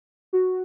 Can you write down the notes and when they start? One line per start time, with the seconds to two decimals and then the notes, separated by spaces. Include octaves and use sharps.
0.33 F#4